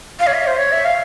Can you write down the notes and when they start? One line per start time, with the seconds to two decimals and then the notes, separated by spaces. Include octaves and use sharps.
0.20 F5
0.27 C#5
0.33 E5
0.46 C5
0.58 C#5
0.72 E5
0.85 F5